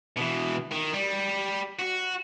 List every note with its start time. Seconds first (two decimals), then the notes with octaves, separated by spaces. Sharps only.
0.17 B2 E3
0.72 D#3
0.94 G3
1.79 F#4